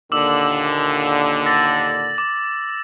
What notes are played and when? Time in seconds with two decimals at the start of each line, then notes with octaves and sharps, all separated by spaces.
0.12 D#2 A#2 D3 D6 E6 F#7
1.46 E6 A6 A#6
2.18 D6